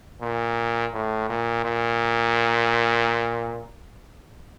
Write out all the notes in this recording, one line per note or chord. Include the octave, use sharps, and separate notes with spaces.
A#2
A2
A#2
A#2